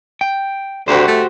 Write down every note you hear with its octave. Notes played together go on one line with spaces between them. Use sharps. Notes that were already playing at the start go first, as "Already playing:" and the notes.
G5
D2 F#4 G4 C5
A3